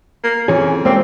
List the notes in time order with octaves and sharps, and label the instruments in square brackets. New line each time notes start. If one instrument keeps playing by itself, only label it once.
[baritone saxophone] A#3
[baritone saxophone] F2 [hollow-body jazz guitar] E3 G#4 [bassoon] C#4
[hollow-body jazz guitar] G3 G#3 A#3 [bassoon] C4